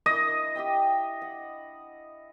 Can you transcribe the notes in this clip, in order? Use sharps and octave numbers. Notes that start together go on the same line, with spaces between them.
D4 E4 D#5
G4 E5 G5
F#5